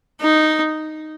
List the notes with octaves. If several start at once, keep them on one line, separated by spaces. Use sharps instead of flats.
D#4